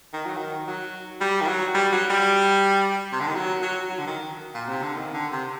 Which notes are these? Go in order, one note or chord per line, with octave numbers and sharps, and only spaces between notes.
D#3
F#3
D#3
F#3
G3
D#3
F#3
G3
F#3
G3
C3
D3
D#3
F#3
F#3
F#3
D3
D#3
A#2
C3
D3
D#3
D3
C3